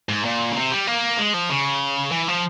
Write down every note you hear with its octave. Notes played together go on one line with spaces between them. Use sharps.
G#2
A#2
C#3
C3
G3
A#3
G#3
F3
C#3
E3
F3